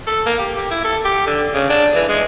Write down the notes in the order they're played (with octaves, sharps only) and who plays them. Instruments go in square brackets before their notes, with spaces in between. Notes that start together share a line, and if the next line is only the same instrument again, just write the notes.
[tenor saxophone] A4
A#3
G4
G4
E4
A4
G4
D3
C#3
D4
E3
G#3